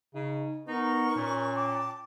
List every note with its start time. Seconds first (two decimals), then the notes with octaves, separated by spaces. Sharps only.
0.15 C#3 D#4
0.68 B3 D#4 A#4 C#6
1.16 A#2 C#4
1.54 G5 A5 D6